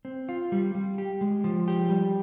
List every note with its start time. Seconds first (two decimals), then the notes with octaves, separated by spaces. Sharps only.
0.05 C4
0.29 F4
0.52 G3
0.75 G3
0.98 G4
1.21 G#3
1.44 F3
1.68 G4
1.90 G3